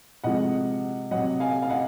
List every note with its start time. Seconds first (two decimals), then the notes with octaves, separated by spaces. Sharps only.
0.24 C3 F3 G#3 D#5 F#5
1.11 C3 F#3 D#5 F#5
1.40 F5 G#5
1.62 F5
1.70 D#5 F#5